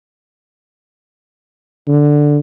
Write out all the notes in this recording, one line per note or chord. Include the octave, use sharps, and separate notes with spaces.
D3